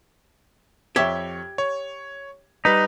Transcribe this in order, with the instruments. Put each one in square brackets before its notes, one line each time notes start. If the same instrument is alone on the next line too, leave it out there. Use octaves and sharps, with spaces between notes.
[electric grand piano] F2 C#5 G#6 [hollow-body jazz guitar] G4 E5
[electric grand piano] C#5
[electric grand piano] G3 B4 B6 [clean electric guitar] D#4